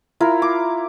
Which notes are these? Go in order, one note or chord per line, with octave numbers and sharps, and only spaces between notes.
E4 F4 A#4
D6